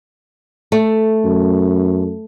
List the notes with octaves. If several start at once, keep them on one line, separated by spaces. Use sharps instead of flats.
A3
F#2